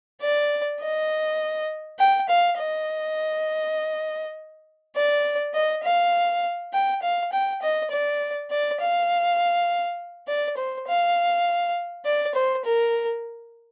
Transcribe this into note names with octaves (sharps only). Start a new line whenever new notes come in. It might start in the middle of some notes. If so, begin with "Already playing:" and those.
D5
D#5
G5
F5
D#5
D5
D#5
F5
G5
F5
G5
D#5
D5
D5
F5
D5
C5
F5
D5
C5
A#4